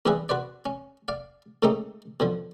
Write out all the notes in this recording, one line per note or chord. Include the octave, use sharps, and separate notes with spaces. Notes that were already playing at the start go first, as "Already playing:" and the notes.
E2 G2 E4 G4 G#4 B4
F#4 B4 C5 D5
C#4
D5 F5
G#2 C#3 A3 A#3 D#4 G4
B2 D3 F3